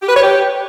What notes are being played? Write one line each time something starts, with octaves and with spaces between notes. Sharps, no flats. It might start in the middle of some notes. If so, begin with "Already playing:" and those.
G4
B4
C#5
G4